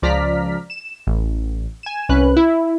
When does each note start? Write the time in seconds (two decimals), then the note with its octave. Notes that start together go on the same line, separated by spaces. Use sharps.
0.02 C#2 F3 D5 A#5 F6 B6
0.70 E7
1.07 A1
1.83 G#5 E7
2.09 C2 C#4 B4 F#6
2.37 E4